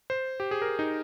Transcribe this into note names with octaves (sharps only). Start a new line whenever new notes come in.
C5
G4
G#4
A#4
D#4